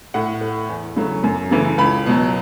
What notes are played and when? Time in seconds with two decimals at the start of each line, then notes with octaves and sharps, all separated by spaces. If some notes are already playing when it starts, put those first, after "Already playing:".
0.14 A2 F#5
0.41 A3
0.69 E2
0.96 C#3 F#3 A3
1.24 F#2
1.51 C#3 E3 A3
1.78 C#2 B5
2.06 B2 F#3